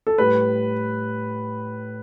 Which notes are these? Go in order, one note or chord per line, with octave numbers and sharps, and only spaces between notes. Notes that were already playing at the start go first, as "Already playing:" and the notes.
A4
A2 G3 B4